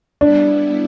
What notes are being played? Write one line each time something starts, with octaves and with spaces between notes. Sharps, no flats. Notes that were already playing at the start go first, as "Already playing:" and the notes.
G3 B3 D4 E4